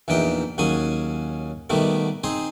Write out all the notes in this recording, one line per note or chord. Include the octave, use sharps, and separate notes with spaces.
A#1 E2 E3 D#4 G5
D#2 F#3 C#4 G#4 G#5
B2 D#3 G3 A3 B3
C4 D#4 G#4 C5